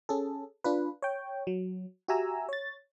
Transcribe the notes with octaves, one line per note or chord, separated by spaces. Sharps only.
C#4 G#4 A4
D4 F4 B4
C#5 G5
F#3
F#4 G4 E5 G#5 A#5 E6
C#5 A6